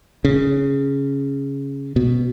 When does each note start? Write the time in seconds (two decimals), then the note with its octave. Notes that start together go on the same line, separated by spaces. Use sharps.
0.25 C#3
1.96 B2